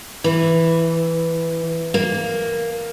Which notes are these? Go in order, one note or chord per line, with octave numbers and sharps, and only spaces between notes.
E3
A#3